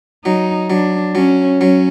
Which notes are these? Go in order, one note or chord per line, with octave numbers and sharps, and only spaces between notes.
F#3 D#4
F#3 D4
F#3 C#4
F#3 C#4